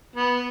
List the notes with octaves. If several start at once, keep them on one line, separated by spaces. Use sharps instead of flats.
B3